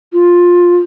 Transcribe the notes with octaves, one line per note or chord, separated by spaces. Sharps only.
F4